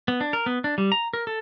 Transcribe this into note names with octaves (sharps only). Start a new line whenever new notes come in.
B3
D4
A#4
B3
D4
G3
A#5
A#4
A4